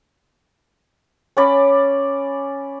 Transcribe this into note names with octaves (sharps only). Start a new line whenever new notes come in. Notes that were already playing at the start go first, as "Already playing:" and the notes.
C#4 D5 B5